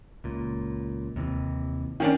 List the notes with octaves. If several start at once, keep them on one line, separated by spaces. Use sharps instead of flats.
C#2 A#2
D#2 C3 E3
D#3 C#4 D4